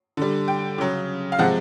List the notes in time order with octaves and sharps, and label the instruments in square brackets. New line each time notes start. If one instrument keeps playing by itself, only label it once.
[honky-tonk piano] D3 G3
G5
C#3 F#3
F5
C3 F3 G#3 F#5